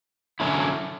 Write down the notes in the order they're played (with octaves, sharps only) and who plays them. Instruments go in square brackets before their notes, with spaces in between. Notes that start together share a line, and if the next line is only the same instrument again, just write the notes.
[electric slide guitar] D3 F#3 A3 C#4 E4